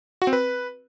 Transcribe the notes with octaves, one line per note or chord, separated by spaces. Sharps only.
F#4
C4
B4